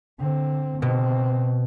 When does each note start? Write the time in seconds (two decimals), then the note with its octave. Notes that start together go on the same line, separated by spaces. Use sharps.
0.19 D3 C4
0.82 B2 C4